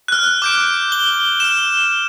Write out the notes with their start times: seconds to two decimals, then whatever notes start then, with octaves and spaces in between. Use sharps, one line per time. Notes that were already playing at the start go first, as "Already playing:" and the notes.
0.08 F6 F#6
0.42 D6 G6 D7
0.92 G7
1.40 F6 E7